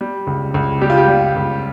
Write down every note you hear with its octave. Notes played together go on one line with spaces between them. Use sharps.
G3
C#2
C#2
G3 G4
F4
G4
G3
C#2